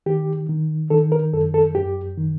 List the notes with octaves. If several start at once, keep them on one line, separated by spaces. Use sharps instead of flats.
D#3 G4
D#3
D#3 A4
A#4
F#2 A4
A4
F#2 G4
D#3